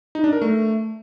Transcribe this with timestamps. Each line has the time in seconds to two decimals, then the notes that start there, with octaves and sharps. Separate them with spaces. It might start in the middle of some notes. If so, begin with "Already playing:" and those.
0.15 D#4
0.24 D4
0.33 A#4
0.41 A3